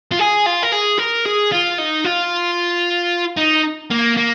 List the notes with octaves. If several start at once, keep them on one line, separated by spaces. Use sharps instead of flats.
F4
G#4
F4
A#4
G#4
A#4
G#4
F4
D#4
F4
D#4
A#3
A#3